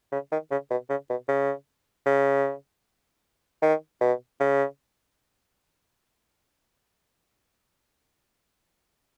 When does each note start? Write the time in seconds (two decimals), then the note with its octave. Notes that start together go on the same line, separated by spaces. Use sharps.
0.12 C#3
0.32 D#3
0.51 C#3
0.71 B2
0.90 C#3
1.10 B2
1.28 C#3
2.06 C#3
3.62 D#3
4.01 B2
4.40 C#3